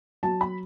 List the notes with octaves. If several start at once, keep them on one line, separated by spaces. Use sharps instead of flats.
F#3 A5
B5